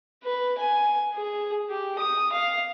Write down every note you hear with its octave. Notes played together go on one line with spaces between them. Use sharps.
B4
G#5
G#4
G4
D#6
F5